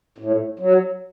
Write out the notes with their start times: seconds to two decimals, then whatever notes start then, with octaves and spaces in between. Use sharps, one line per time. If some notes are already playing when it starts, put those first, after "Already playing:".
0.18 A2
0.59 F#3